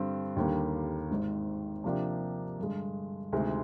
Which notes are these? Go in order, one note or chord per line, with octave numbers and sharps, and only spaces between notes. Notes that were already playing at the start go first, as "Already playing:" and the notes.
Already playing: G2 D3 G3 C4
D#2 D3 G3 A#3
G#1 G#2 D#3
C3 F3 A#3 D4 G4
G2 D3 G#3
D2 C3 D#3 G#3